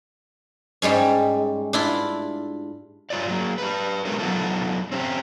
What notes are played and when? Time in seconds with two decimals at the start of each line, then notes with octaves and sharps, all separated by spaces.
0.82 G#2 G3 G#3 C#4
1.73 D4 E4 F4
3.10 G2 F4 C#5 D5
3.28 F#3 A#3
3.58 G4 B4
4.05 G#3 A3 B3 C#4 F#4 A#4
4.19 F2 F#3 B3 D#4 F4 A4
4.92 C4 C#4 G4